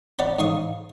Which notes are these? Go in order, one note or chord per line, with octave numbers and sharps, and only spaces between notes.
C#4 D5 F#5 B5
G#2 F5 C#6 D#6